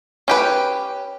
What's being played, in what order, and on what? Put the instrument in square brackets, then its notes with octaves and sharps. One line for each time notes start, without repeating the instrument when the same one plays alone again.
[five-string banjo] C#4 G4 B4